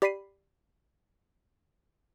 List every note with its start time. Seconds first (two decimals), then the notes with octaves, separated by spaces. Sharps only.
0.02 G4 D5 B5 B6 C7 D#7